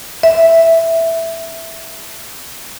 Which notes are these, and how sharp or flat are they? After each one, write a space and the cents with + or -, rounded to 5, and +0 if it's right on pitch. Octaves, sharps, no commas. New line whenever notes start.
E5 +0